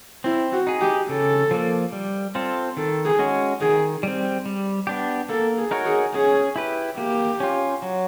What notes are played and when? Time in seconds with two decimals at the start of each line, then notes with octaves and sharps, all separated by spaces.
0.24 C4 E4
0.52 F#4
0.67 D#4 G#4
0.81 G4
1.09 C#3 A4
1.51 F3 A#3
1.92 G3
2.35 C4 F4 A4
2.77 D#3 A4
3.05 G#4
3.19 G#3 C#4 F#4
3.61 D#3 G#4
4.03 G3 C4
4.46 G3
4.87 B3 D4 G4
5.29 A#3 A4
5.58 G#4
5.71 D#4 F#4 A#4 C#5
5.86 G#4
6.14 C#4 G#4
6.56 E4 G4 B4
6.97 A#3 G4
7.40 C#4 F4
7.82 F#3